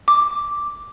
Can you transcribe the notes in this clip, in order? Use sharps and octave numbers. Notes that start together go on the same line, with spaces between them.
D6